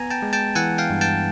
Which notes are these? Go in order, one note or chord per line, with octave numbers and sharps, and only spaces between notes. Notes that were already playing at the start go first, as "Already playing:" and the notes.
Already playing: B3 G#5 A#5
G5 A5
G#3
G5 A5
E3 F#5 G#5
F5 G5
G2
G5 A5